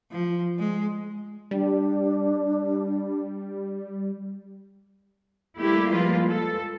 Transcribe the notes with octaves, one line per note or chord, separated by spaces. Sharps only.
F3
G#3
G3 D4
G3 A3 A#3 E4 G4
F3 G3 G#3 A#3 F4 B4
A4